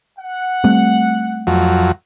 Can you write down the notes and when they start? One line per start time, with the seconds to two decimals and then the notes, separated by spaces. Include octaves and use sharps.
0.19 F#5
0.64 G3 A3 C4
1.47 F2 F#3